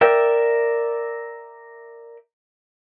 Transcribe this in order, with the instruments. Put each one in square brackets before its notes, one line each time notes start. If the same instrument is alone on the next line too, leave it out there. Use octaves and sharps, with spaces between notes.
[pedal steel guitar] A#4 D5 E5 G5